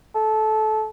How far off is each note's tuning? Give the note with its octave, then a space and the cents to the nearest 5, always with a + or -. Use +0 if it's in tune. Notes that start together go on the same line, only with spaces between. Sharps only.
A4 -20